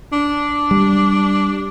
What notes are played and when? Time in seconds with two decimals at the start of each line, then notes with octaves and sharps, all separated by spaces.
0.13 D4
0.71 G3